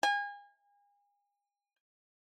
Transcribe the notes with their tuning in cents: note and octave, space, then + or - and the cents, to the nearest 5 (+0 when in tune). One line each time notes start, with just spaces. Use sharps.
G#5 -35